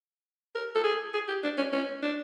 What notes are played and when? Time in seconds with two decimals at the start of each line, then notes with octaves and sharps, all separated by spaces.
0.55 A#4
0.75 A4
0.84 G#4
1.14 G#4
1.28 G4
1.44 D4
1.58 C#4
1.73 C#4
2.02 D4